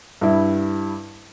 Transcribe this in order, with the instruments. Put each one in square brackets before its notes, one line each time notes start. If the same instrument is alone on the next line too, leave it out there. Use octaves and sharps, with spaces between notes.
[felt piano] G2 G3 E4